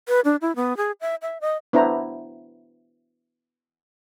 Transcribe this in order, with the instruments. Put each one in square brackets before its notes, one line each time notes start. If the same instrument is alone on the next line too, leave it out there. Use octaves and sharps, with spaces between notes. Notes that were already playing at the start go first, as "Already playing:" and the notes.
[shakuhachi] B4
D4
E4
B3
G#4
E5
E5
D#5
[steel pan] B3 D4 E4 C5 A#5